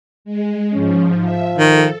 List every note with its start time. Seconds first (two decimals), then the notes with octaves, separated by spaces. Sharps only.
0.25 G#3
0.73 G#2 F3 C#4
1.23 F3 E5
1.58 D#3 A4